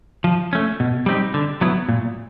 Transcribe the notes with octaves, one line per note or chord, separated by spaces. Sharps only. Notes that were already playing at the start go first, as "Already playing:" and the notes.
F3
A3 C#4
B2
G3 C4 D#4 G4
D3
F#3 B3 E4
A#2